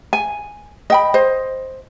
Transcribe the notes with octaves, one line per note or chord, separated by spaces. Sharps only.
G#5
D#5 G5 B5
C5 D#5